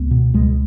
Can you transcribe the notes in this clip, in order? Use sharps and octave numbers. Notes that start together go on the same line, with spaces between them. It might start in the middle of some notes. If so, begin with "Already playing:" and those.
Already playing: C#2 B3
B2
C#2 G#3